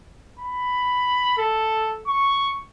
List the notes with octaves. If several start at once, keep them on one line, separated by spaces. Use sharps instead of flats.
B5
A4
C#6